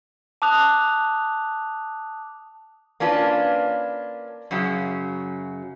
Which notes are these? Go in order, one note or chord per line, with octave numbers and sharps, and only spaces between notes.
A5 D6 D#6 F#6 F7
A#3 C#4 D4 F4 B4
F#2 C#3 F#3